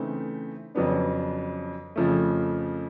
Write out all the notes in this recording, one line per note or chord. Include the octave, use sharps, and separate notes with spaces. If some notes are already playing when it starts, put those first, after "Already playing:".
Already playing: C#3 E3 A3 C4 D#4
F2 C#3 F#3 B3 D4
F2 C#3 F3 A3